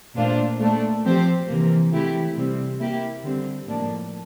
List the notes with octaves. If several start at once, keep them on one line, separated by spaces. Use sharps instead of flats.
A#2 A3 D4 F4 C5
A#2 A3 D4
F3 C4 G4 C5
C3 E3 A#3
C3 E3 A3 E4 G4
C3 G3 C4
A#3 E4 G4
D3 G3 C4
A2 F3 A#3 D4